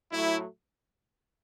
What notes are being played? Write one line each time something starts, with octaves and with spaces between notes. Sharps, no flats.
A2 F#3 A3 E4